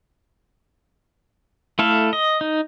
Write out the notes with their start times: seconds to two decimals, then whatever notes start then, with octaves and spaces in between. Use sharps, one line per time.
1.79 A3 E4 A4 F5
2.13 D#5
2.41 D#4